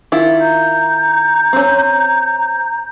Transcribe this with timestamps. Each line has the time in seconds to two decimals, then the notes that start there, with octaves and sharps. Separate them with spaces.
0.12 D#3 E4 F4
0.41 A#5 G6
1.53 C4 C#4